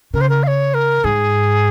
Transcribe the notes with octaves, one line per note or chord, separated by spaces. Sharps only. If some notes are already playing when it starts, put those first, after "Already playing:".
C#3 A#4
C5
A#4
F5
C#5
A#4
G#2 G#4